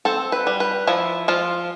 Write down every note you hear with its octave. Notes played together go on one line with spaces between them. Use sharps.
C4 A4
B4
G3
B4
F3 E4
F3 F4